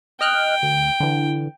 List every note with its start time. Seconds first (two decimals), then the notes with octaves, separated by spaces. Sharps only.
0.21 D#5 G5 F6 F#6
0.63 D2
1.00 D3 E3